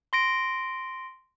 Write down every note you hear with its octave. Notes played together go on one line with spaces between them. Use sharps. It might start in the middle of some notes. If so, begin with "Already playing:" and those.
C6 A#6 D7